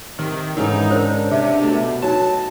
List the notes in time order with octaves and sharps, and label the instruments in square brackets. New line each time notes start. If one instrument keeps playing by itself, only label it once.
[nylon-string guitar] C3 [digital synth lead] D#3
[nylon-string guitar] G#2 C#3 [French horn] E3 [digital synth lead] D#4 [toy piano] A4 A#4
[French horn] D4 [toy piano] A#4 C5 C#5
[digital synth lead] C3 [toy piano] E5
[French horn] B2 [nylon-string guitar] A3
[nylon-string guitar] F#3 [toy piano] D#4 F#4 [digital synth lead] A5